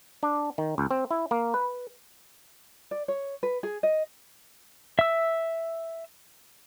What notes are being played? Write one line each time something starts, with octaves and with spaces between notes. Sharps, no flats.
D4
D#3
C#2
C4
E4
A#3
B4
D5
C#5
B4
G#4
D#5
E5 E6